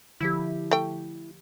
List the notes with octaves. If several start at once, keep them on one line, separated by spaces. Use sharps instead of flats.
D3 F3 E4 G4
A3 G5